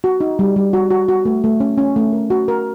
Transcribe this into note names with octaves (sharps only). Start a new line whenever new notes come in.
F#4
D#4
G3
G3
F#4
F#4
F#4
A3
A3
C#4
C#4
A3
A#4
F#4
A#4